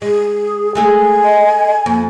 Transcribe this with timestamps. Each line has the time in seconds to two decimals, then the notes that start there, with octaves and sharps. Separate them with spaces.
0.02 G#3 G#4
0.75 G#3 A3 G#4 G#5
1.24 D#5
1.86 F2 A#3